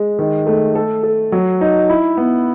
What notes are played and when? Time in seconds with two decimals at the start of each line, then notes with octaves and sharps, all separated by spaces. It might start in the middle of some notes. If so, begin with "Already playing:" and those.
Already playing: G#3
0.19 D#3
0.47 A3
0.75 A4
1.03 A4
1.32 F#3
1.61 D#4
1.89 E4
2.17 B3